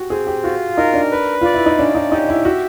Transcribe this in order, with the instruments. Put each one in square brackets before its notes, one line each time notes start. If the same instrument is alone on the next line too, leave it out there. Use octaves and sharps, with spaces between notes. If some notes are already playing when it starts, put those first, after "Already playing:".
Already playing: [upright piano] F#4 G4
[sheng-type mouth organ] C4 [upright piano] G#4
[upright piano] G4
[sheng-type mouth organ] F4 [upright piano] F#4
[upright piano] D#4 [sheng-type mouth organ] A#4
[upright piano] D4
[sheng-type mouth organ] B4
[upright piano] F4 [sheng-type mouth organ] D5
[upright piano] E4
D#4
[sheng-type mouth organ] C#4 [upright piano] D4
[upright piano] D#4
[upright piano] D#4 [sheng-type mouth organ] G4
[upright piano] E4
[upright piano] F#4 [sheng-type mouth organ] E5